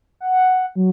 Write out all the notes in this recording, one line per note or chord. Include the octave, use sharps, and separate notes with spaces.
F#5
F#3